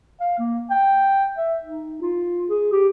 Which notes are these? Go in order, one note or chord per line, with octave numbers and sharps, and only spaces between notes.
F5
A#3
G5
E5
D#4
F4
G#4
G4